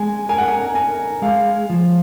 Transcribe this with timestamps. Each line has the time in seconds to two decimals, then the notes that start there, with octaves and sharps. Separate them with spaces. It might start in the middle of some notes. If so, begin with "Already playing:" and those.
Already playing: G#3 G#5
0.29 A#4 G#5
0.38 F#5
0.48 G#5
0.75 A#4 G#5
1.22 G#3 F5
1.70 F3